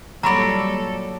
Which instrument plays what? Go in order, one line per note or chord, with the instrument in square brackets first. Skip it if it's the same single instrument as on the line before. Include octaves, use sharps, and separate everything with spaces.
[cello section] A#2 G3 A4 [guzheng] F#3 D5 [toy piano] A#5 B5